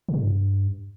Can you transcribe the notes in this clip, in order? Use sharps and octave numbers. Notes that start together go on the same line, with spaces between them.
C3
B2
G2